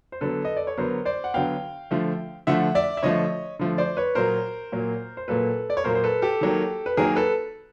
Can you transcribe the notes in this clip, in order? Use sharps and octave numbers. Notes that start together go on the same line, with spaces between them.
C5
D3 F#3 B3 A4 B4
D#5
D5
C#5
D3 F#3 B3 A#4 C5
C5 D5
F#5
D3 F#3 B3 F5 G5
D3 F3 A3
D3 F3 A3 E5 F#5
D5 E5
E5
D3 F3 A3 C#5 D#5
D3 F3 A3
C5 D5
B4 C#5
A#2 F#3 A#3 A#4 C5
A#2 F#3 A#3
C5
A#2 F#3 A#3 A4 B4
D5
C#5
A#2 F#3 A#3 A#4 C5
C5
A4 B4
G4 A4
D#3 F#3 A#3
B4
D#3 F#3 A#3 G#4 A#4
A4 B4